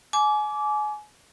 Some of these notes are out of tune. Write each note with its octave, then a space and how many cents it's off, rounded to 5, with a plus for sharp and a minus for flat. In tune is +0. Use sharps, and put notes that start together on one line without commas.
G#5 +30 D6 -15